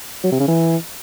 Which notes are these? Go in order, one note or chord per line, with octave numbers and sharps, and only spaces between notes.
F#3
C3
C#3
E3